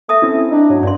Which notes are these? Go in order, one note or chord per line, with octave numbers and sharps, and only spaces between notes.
A3 E5 A5 D#6
C4 C#4 E4
D4 D#4
G#2 F#3
G2 D5 C6